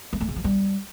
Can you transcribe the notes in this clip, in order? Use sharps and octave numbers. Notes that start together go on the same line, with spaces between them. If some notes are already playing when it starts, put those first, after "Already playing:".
G#3
A3
C#3
F3
G3